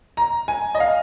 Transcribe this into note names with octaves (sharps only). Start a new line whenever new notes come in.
A#5
G#5
D#5
F5